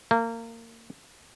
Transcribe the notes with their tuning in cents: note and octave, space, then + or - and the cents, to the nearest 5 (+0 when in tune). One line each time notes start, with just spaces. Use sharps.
A#3 -25